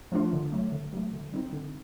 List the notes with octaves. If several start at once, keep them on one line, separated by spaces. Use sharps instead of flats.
F3 A3 D4 F4
D3
F#3 A3
D3
F#3 A3
D3
G3 C4 D#4
D3